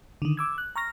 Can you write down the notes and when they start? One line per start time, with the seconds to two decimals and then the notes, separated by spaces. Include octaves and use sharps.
0.22 D3 D#3
0.37 D6 E6 G#6
0.58 F#6
0.76 A#5 C#6 F6 A#6